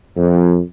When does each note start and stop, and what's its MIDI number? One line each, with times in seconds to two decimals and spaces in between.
0.17 0.59 41